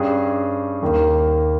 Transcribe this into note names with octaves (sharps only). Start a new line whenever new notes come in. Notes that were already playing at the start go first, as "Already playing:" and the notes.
Already playing: G2 G3 C#4 G#4
D#2 D#3 A#3